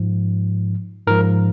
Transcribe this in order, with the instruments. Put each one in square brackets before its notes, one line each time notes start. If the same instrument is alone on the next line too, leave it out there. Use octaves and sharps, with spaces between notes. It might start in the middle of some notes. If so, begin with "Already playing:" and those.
Already playing: [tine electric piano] G#2 F3
G#2 F3 A#4